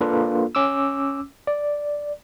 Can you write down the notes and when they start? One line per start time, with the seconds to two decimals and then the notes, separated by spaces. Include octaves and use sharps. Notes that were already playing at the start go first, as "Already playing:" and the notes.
0.01 A#3 D4 F4 A4 B4
0.55 C#4 D6 E6
1.47 D5